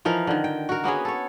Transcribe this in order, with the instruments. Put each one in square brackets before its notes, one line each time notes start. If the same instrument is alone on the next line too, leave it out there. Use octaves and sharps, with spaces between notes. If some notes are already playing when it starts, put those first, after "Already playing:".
[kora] E3 F3 D#4 A#4
D3 D#3
G5
F#4 A#4
A#3 B3 C#4 G#4
A4 C#5